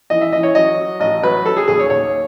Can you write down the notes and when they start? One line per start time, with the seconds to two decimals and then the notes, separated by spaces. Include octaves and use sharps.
0.10 E3 D#5
0.21 E5
0.32 E3 D#5
0.43 C#5
0.55 F#3 D#5
0.78 F#3
1.00 A1 D#5
1.23 F#3 B4
1.46 F#3 A4
1.57 G#4
1.68 D#2 G#4
1.80 C#5
1.90 D#2 C#5